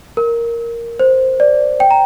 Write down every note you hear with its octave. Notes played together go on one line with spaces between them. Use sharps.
A#4
C5
D5
G5
A#5